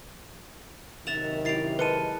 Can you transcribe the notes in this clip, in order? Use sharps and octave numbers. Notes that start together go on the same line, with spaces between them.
F#2 C3 D#3 E5 F#5 A6 E7 F7
E4 G4 A6 C7 F7
G#3 A#4 B4 A5 C#7 D#7